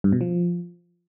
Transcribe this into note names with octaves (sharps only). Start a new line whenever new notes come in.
G2
B2
F3